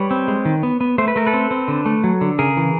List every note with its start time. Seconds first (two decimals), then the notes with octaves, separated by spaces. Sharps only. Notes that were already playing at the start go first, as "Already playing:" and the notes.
Already playing: G3 B4 C#5
0.11 C4
0.28 G#3
0.45 D#3
0.63 B3
0.81 B3
0.98 A3 C5
1.08 B4
1.16 A3 A#4
1.26 A4 B4
1.33 C4
1.51 C4
1.68 D3
1.86 A3
2.04 F#3
2.21 D3
2.39 C#3 G#4 A#4
2.57 E3